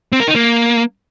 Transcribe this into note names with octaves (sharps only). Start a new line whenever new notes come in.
C4
A#4
D#4
A#3